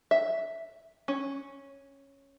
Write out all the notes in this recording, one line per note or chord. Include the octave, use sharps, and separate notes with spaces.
E5
C#4